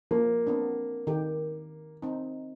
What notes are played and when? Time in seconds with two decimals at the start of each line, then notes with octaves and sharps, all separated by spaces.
0.11 F3 A#3
0.47 B3 C4 D4
1.07 D#3 G4
2.02 C4 D#4